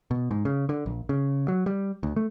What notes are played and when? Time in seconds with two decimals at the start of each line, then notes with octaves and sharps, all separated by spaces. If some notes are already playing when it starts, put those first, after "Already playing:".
0.11 B2
0.31 G#2
0.45 C#3
0.69 D3
0.86 A#1
1.09 C#3
1.48 F#3
1.66 G3
2.03 D2
2.16 A3